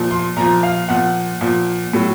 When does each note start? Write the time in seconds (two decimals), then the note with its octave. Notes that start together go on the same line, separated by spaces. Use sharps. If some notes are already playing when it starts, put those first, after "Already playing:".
Already playing: A#2 F3
0.11 C6
0.37 A#2 F3 A#5
0.63 F5
0.89 A#2 F3 F#5
1.41 A#2 F3
1.93 A2 F#3